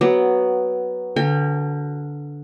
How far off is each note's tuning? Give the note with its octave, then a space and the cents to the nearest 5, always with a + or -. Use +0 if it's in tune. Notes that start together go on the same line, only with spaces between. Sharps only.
F#3 +10 B3 +0
D3 -10 A#4 -30 G5 +35